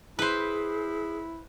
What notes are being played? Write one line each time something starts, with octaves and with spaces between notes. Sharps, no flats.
E4 G#4 B4 C5